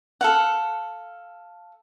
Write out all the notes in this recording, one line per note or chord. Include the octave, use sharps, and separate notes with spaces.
A4 F5 F#5